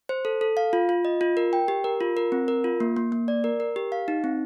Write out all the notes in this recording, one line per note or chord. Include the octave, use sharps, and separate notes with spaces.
C5
A4
A4
F5
F4
F4
D#5
F4
A#4
G5
G4
A#4
F4
A#4
C4
A#4
F4
A#3
A#3
A#3
D5
A#4
A#4
G4
F5
D#4
C4